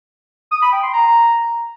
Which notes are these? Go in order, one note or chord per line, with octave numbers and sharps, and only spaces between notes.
D#6
B5
G5
C6
A#5